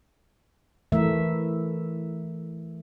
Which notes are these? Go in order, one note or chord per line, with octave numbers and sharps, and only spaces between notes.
E3 A3 A#4 E5